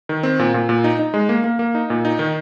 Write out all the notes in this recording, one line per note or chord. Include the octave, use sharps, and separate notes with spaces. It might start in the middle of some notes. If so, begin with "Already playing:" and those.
D#3
C4
A#2
A#2
A#2
D#4
D#4
G#3
A#3
A#3
A#3
D#4
A#2
D#4
D#3